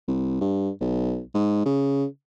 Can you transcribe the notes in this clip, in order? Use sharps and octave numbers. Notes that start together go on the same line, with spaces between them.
C2
G2
B1
G#2
C#3